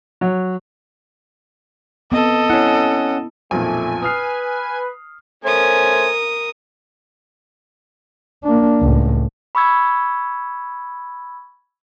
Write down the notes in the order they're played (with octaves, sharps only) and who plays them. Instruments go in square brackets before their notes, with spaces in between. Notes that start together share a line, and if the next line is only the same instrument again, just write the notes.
[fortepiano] F#3
[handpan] B3 C4 [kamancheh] A4 D#5
[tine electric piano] C#4 F#5 [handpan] E4
[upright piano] B1 F2 A#2 [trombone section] A3 [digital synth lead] G#5
[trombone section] B4 [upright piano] D#6 F6 C7
[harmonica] A3 C#4 C5 [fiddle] A#4 D#6 [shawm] G#5
[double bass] A#3 D4
C#2 A2
[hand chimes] B5 C#6 E6 G#6